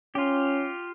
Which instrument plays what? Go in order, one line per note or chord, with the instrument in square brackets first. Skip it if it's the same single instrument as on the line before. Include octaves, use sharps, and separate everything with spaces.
[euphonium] C#4 [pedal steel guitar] F4 G4